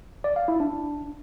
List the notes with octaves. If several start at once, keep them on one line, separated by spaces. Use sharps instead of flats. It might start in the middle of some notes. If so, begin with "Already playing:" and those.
D5
F5
E4
D4